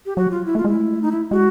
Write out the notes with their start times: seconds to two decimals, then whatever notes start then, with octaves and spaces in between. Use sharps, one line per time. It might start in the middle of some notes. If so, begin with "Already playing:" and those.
0.06 G4
0.16 F#3 F#4
0.31 F4
0.46 E4
0.55 A3
0.58 F4
0.65 G#3
0.68 E4
0.74 A3
1.02 D#4
1.12 E4
1.31 G#3 F#4